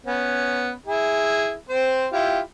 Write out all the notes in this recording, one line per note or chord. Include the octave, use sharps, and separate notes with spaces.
B3 C#4
E4 G#4
C4 C5
E4 F4 G4